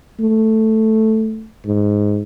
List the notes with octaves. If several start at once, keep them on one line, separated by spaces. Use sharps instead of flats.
A3
G#2